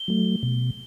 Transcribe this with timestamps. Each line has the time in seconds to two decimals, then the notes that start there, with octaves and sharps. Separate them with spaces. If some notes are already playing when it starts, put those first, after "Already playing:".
Already playing: G7
0.08 F#3 A3
0.43 B2